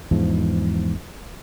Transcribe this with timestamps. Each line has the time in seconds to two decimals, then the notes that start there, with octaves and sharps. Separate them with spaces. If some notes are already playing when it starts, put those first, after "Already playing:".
0.11 E2 G#2 F3